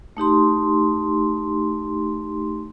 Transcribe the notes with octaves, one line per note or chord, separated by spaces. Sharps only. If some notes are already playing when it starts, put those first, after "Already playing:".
A3 D#4 G4 C6